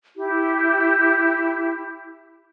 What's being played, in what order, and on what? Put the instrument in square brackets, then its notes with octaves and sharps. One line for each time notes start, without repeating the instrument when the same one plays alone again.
[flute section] E4 G4